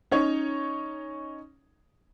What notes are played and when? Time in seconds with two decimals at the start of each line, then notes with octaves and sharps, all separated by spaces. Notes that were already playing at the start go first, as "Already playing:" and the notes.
0.11 C#4 D#4 C#5